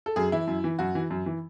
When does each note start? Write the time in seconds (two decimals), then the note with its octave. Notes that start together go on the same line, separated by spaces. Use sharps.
0.06 A4
0.16 F#2 G#4
0.32 E3 E4
0.47 F#2
0.64 E3
0.79 F#2 F#4
0.95 E3
1.10 F#2
1.26 E3